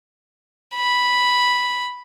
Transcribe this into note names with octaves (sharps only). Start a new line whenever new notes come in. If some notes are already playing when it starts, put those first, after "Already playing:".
B5